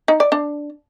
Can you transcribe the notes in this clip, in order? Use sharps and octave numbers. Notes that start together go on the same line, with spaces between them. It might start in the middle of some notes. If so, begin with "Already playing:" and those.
D#4
D5
D4